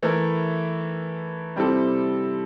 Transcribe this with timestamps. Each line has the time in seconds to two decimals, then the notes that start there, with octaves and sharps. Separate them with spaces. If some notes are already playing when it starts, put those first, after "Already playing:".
0.03 E3 A3 E4 A#4
1.56 C3 G3 C4 E4 A4